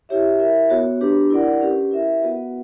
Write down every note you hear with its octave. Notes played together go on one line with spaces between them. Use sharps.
E4 G4 C#5 E5
E4 A#4 E5
B3 F#4 C#5
D4 G4 B4
E4 A#4 D5 F#5
C#4 G4 B4
E4 A#4 E5
B3 F#4 B4 F#5